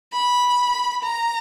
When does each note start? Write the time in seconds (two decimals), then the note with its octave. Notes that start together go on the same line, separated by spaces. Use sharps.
0.13 B5
1.04 A#5